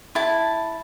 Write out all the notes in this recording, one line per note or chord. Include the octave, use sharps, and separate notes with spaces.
E4 A5